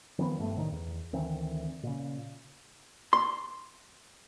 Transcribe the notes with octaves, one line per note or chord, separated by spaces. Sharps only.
D#3 F3 A#3 B3
F1 G2 C3 A3
C2 A2 D#3
E2
D2 D#3 E3 C4
A#2 C#3
C6